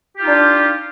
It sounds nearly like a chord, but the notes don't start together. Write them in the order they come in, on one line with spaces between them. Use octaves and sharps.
G4 F4 D#4 D4